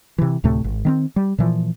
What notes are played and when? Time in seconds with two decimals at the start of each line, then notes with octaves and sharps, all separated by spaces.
0.18 C3 E3
0.44 D2 A2 C3 A3
0.64 G#1
0.85 D#3 A#3 C4
1.16 G3
1.38 A#2 E3 F3